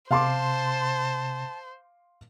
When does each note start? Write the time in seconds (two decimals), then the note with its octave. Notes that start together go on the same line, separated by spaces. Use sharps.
0.11 C3 C5 F5 A5 C6 D6